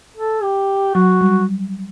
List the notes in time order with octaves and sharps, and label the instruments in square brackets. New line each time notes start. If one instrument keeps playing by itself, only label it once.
[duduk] A4
G4
[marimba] F#3 [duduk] F#4
[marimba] G3